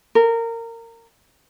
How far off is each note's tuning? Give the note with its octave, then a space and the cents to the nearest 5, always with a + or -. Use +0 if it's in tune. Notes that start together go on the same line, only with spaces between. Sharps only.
A#4 -20